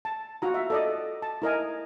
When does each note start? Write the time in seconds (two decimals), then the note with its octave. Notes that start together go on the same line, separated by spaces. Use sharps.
0.05 A5
0.42 F4 F#4 A#5
0.54 E5
0.70 A4 D5 D#5
1.22 A5
1.42 E4 A#4 D#5 G#5